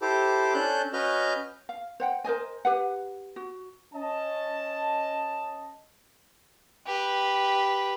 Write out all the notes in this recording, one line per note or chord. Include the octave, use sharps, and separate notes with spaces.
E4 G4 A4 C5 D6
C#4 D4 A4 F#6 G6
C#4 F#4 B4 D#5 F6 G6
F5
C5 F#5 G5
A#4 C5 D#5 G#5
G4 B4 F#5
F#4
C#4 D#5 A5
G4 B4